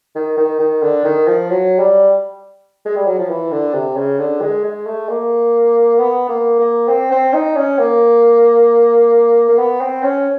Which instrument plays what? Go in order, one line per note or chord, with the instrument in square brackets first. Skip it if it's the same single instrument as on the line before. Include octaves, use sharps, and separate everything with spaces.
[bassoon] D#3
D#3
D#3
D3
D#3
F3
F#3
G3
G#3
G3
F#3
F3
E3
D3
C3
C#3
D3
G#3
G#3
A3
A#3
B3
A#3
A#3
C4
C4
D#4
C#4
A#3
A#3
B3
C4
C#4